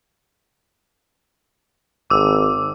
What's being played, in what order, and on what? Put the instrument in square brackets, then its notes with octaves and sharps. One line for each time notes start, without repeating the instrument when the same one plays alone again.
[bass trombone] G#1 [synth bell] D6 E6